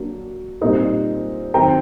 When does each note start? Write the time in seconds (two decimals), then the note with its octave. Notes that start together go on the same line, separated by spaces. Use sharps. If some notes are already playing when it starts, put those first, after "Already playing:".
Already playing: F#3 A#3 D4
0.61 A#2 G3 C4 D#4
1.54 D#3 F#3 C4 D#4 G5 A#5